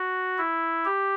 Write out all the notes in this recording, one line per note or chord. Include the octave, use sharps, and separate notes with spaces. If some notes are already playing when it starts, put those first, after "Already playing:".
Already playing: F#4
E4
G4